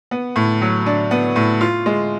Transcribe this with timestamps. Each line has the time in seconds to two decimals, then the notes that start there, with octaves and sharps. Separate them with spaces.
0.11 B3
0.36 A2
0.62 F#3
0.86 D4
1.11 B3
1.36 A2
1.61 F4
1.86 G#3